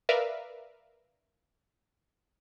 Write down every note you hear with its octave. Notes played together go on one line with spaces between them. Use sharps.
A#4 B4 D5 E5 F5